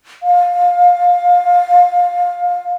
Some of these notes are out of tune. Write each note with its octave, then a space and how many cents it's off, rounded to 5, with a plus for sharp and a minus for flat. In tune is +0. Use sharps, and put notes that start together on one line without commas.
F5 +20